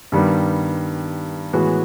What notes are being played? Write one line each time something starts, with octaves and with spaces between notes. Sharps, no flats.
G2 D#3 G3 B3
A2 E3 G#3 B3 F#4